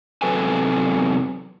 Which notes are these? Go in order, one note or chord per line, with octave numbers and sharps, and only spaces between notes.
E2 C3 F#3 A4 B4 G#5